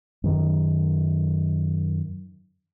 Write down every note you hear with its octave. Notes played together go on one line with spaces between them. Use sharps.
F#2 D#3